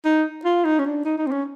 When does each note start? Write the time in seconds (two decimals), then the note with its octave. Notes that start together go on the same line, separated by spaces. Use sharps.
0.05 D#4
0.45 F4
0.65 D#4
0.79 C#4
0.86 D4
1.05 D#4
1.18 D#4
1.27 C4
1.32 C#4